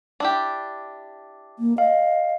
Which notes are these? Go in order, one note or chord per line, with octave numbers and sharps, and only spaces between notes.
D4 E4 G4
A#3
D#5 F5